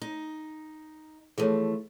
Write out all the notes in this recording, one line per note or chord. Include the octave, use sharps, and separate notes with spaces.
D#4
E3 F3 A3 G#4 A4 C#5